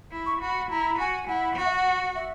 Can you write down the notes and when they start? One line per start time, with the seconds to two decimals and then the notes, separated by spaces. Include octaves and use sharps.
0.11 E4
0.26 C#6
0.41 F#4 B5
0.70 E4 A#5
0.99 F#4 G#5
1.28 E4 F#5
1.56 F#4 F#5
1.65 E5
1.72 F#5
2.15 E5